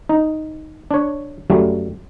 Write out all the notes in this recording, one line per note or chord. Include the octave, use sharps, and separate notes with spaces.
D#4
D4 C#5
F#2 F#3 G3 A3